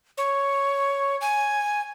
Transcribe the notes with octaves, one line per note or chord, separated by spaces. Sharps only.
C#5
G#5